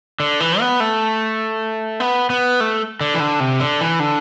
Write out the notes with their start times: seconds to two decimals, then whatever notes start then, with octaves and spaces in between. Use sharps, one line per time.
0.20 D3
0.40 E3
0.60 B3
0.80 A3
2.00 B3
2.30 B3
2.60 A3
3.01 D3
3.14 E3
3.20 D3
3.40 C3
3.60 D3
3.81 E3
4.00 D3